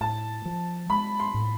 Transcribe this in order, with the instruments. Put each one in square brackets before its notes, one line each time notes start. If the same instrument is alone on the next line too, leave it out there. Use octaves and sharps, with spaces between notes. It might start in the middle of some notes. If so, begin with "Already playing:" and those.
[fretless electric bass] A2 [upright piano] A5
[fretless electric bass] F3
[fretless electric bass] G#3 [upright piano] B5
[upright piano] C6
[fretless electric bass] A2